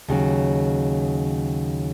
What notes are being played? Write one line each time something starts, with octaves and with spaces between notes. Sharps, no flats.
D#2 C#3 F#3